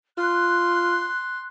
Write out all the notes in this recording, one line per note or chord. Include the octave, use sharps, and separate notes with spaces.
F4 C6 F#6